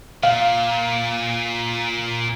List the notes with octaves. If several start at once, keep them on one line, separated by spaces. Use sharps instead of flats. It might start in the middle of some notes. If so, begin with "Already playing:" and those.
A#2 F5